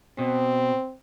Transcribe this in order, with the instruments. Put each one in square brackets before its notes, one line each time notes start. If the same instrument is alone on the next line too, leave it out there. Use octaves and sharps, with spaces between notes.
[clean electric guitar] B2 [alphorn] C4